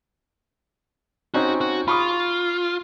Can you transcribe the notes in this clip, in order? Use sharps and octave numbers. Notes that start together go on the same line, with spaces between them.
C4 C#4 D#4 F#4
F#4
F4 B5 C#6 D#6